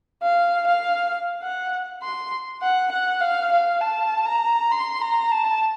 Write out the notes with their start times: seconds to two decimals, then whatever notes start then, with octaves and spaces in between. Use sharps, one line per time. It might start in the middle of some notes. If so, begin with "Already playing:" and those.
0.22 F5
0.67 F5
1.42 F#5
2.02 C6
2.62 F#5
2.91 F#5
3.21 F5
3.51 F5
3.81 A5
4.25 A#5
4.71 C6
5.01 A#5
5.31 A5